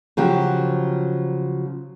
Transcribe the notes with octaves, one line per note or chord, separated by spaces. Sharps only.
C#3 F3 F#3 G4